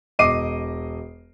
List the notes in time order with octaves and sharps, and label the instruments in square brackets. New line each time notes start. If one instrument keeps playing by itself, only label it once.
[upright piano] E1 D#5 D6 C7 D#7